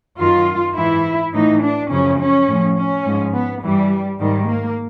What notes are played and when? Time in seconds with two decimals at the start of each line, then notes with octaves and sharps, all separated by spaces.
0.19 F#2 D#3 F4
0.77 G#2 E3 E4
1.33 A2 E3 D#4
1.62 D4
1.90 F#2 C#3 F3 C#4
2.19 C#4
2.47 A2 F3
2.77 C#4
3.05 G#2 F3
3.33 B3
3.62 G2 E3 G3
4.19 G#2 D#3 G3
4.47 A#3